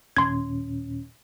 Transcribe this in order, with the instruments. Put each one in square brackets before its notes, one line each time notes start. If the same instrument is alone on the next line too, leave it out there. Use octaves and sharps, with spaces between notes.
[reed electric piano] D#2 A#2 C#4 [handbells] C6 G#6